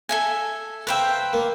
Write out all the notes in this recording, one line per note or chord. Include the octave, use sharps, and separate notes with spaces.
A4 E5 G#5
B4 C5 E5 F5 G5 A#5
A#3